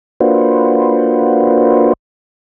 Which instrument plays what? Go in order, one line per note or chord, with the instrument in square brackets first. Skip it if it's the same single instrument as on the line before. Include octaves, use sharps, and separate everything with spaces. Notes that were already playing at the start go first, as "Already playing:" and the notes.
[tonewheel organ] A#3 D4 F4 F#4 B4 C5